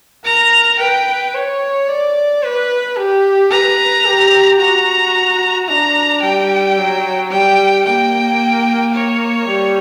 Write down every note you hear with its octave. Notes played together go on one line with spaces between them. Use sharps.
A#4 A#5
B4 G5
C#5
D5
B4
G4
B4 A#5
G4
F#4 A#5
D4 A#5
G3 G5
F#3
G3 G5
A#3 G5
C#5
G3